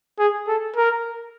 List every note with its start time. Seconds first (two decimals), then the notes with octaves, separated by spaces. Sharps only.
0.19 G#4
0.48 A4
0.76 A#4